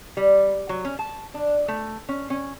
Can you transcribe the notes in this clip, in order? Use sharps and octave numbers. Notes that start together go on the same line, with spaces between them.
G3
F#3
C#4
A5
D4
A3
C#4
C#4